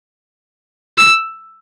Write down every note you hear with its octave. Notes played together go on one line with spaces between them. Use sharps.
E6